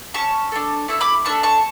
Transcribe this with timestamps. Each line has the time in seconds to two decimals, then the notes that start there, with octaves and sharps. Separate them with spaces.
0.14 G4 A5 C#6
0.18 C#4
0.52 D4 A4
0.88 A3 E4 A4
1.01 B5 D6
1.25 A3 D4 A4 A5 C#6
1.43 A5 C#6